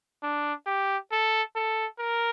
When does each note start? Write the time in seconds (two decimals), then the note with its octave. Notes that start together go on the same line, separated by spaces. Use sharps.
0.23 D4
0.66 G4
1.12 A4
1.56 A4
2.00 A#4